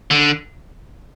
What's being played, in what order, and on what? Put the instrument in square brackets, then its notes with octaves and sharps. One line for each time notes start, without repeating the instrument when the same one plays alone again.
[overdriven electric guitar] D3